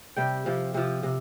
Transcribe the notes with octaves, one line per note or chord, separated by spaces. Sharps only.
C3 G3 G5
C3 F3
C3 F3
C3